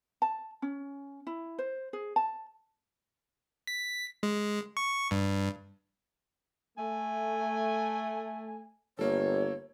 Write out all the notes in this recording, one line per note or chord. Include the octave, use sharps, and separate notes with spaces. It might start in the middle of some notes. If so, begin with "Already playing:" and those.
A5
C#4
E4
C5
G#4
A5
B6
G#3
C#6
G2
A3 G#5
G1 A#3 A4 C#5